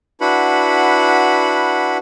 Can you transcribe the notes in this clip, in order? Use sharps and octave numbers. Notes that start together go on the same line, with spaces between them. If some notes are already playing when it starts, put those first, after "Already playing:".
D4 E4 F#4 B4 F#5 B5